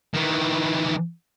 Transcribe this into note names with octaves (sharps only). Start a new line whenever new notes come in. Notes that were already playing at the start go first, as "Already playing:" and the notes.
D#3 E3